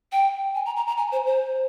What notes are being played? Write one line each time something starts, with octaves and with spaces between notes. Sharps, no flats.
G5
G#5
A#5
A#5
A#5
G#5
C5
C5